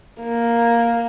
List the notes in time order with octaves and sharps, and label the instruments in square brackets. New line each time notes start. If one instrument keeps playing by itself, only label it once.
[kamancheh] A#3